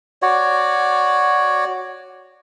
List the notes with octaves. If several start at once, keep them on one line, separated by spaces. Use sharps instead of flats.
F#4 C#5 D5